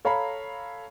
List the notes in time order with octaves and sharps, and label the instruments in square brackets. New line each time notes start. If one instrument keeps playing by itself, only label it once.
[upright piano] A4 C#5 F5 A#5 B5